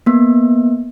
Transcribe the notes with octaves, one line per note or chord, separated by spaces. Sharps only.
A#3 B3